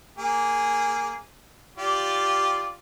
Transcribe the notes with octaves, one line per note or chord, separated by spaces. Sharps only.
A#3 G#4
F4 G4 D5